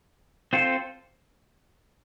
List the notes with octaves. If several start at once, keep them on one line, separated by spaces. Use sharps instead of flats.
C4 F4 A4 C5